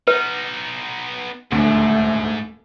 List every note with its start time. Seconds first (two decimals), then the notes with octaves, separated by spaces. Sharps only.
0.08 B3 D#4 B4
1.52 D#1 D2 G#2 A3